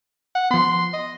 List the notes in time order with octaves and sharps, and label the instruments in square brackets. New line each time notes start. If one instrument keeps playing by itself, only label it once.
[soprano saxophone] F#5
[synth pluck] F3 B3 [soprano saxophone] C6
[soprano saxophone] D#5